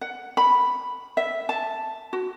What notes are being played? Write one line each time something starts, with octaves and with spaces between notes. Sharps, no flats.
F#5
B5
E5
A5
F#4